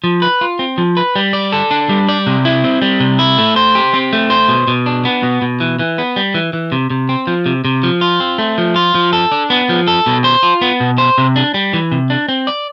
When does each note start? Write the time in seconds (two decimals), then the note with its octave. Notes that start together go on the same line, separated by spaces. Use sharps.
0.04 F3
0.22 B4
0.41 F4
0.59 C4
0.78 F3
0.97 B4
1.16 G3
1.33 D5
1.52 A4
1.71 D4
1.89 G3
2.09 D5
2.27 C3
2.45 E4
2.64 C4
2.82 G3
3.00 C3
3.19 E4
3.38 A3
3.56 C5
3.75 G4
3.94 C4
4.13 A3
4.30 C5
4.49 B2
4.67 B2
4.86 D4
5.05 B3
5.23 B2
5.42 B2
5.60 E3
5.79 E3
5.98 B3
6.16 G3
6.34 E3
6.53 E3
6.72 C3
6.90 C3
7.09 C4
7.27 F3
7.46 C3
7.65 C3
7.83 F3
8.01 F4
8.20 C4
8.38 A3
8.58 F3
8.76 F4
8.95 F3
9.13 A4
9.32 D4
9.50 B3
9.69 F3
9.88 A4
10.06 B2
10.24 C5
10.43 F4
10.61 B3
10.80 B2
10.98 C5
11.18 C3
11.36 D4
11.54 G3
11.73 E3
11.92 C3
12.10 D4
12.28 C4
12.47 D5